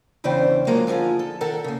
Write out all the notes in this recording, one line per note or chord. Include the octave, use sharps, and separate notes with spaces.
E2 C#3 E3 D4 C5 G5
F3 F#3 G#3 A#3
D3 F3 D#4 F4 G#4
A4
D#3 A4 A#4 F#5
C#3 A#3